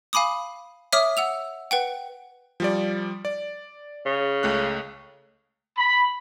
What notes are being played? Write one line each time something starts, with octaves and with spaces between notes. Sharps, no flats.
F5 G#5 B5 D6 D#6
C#5 E5 D6 D#6 F6
F#5 E6 F7
B4 F#5 G5
F3 G3 D5
D5
C#3
C#2 A3 F#6
B5